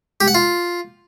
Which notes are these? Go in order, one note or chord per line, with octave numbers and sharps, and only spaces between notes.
G4
F#5
F4